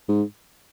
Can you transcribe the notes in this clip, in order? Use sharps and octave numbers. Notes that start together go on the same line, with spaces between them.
G#2